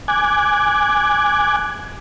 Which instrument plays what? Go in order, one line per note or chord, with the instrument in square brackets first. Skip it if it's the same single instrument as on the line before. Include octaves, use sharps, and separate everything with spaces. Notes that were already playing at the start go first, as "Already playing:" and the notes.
[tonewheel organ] G#5 D6 F#6 G#6